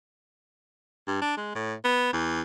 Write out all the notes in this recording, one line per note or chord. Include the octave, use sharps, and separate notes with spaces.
G2
D4
G#3
A2
B3
E2